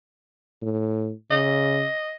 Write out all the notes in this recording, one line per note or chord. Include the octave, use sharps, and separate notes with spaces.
A2
C#3 D#5